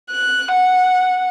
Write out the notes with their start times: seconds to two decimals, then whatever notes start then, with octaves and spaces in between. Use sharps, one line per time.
0.10 F#6
0.52 F#5